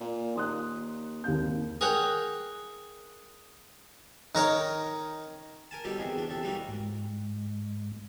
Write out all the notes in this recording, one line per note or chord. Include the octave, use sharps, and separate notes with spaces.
A#2
D#2 C6 D#6 F#6
G#1 D#2 G6
G#4 A#4 C#5 F#5 G5
D#3 A#4 C#5
A#4 G#5 A5
B2 F#3 G3 D#4 G4 A4
E2 C3 G#4
E2 D4
E2 C3 A4
E3 F#3 G3 A#3 D#4 F#4
G#2